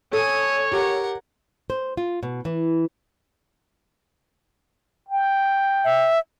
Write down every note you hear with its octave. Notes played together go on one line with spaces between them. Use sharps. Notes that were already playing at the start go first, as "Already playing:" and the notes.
A4 C#5 G#5 D#6
G4 A#4 F#5
C5
F4
B2
E3
G5
E5